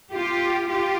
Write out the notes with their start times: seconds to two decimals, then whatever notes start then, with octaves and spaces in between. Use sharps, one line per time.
0.12 F4 G4
0.68 F4 G4